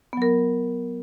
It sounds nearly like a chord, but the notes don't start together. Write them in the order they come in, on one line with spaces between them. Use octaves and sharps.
B3 F#3 A#4